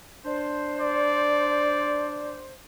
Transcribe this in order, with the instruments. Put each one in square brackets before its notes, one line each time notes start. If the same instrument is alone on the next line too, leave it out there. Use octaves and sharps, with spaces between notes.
[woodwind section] D4 C5
[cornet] D5